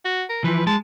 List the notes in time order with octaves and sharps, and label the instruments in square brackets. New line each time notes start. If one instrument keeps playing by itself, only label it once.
[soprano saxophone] F#4
A#4
[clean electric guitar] E3 F3 [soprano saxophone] B4
[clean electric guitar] G#3 [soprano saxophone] A5